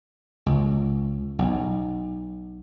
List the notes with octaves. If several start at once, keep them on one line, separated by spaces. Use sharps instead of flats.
C#2
B1